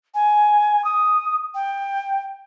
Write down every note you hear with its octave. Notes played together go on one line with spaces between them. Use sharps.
G#5
D#6
G5